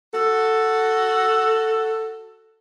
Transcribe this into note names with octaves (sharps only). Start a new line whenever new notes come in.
F#4 A4